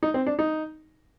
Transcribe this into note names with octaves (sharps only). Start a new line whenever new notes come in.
D#4
C4
D4
D#4